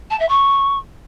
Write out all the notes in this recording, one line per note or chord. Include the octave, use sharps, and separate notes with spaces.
A5
E5
C#6